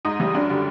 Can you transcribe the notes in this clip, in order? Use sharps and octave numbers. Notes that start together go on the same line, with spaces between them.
G#2 D#4
E3 G3
F#2 D4
D3 G3